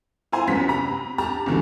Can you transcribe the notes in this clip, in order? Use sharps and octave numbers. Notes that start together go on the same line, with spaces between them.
E4 F4 C5 G#5 A#5 C6
F#2 B3 B6
C3 A#5 B5
G4 A5 A#5
F#1 C#2 B2 D3 E3